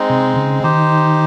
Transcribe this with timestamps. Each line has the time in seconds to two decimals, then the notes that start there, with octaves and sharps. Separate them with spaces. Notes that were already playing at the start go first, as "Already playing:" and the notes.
Already playing: G#3 C4 D#4
0.10 C3
0.36 C#3
0.63 D#3 D#4 G4 C5